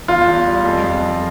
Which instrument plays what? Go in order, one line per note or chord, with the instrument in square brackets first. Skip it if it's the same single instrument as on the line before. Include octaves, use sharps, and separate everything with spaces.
[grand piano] E2 F4
E2
G3
F2
F2
F3